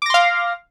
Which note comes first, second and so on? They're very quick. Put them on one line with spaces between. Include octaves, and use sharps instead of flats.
D6 A#6 C6 F5